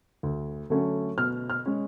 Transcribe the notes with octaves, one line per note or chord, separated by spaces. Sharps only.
D2
D3 F#3 A3 C#4
B2 F6
F6
G#3 C#4